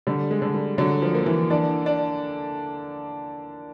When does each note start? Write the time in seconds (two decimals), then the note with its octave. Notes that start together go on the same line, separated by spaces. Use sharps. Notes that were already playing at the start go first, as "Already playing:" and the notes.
0.07 D3 G3
0.31 G#3
0.42 D3
0.54 G3
0.78 D3 F#3
1.02 F3
1.14 A#3
1.26 E3
1.50 E3 D4
1.86 D4